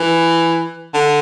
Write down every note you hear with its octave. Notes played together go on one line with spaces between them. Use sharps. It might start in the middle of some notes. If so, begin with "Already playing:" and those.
Already playing: E3
D3